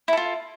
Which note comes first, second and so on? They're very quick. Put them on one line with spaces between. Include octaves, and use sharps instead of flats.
E4 A4 F4